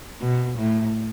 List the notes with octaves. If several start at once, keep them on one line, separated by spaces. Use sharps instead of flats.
B2
A2